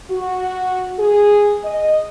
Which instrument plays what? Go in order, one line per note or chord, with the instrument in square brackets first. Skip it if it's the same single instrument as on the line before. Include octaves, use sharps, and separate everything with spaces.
[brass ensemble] F#4
G#4
D#5